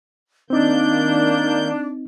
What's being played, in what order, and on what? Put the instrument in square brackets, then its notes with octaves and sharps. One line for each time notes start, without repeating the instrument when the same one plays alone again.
[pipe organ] D#3 A#3 G6 [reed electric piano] C4 D#4 [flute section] D4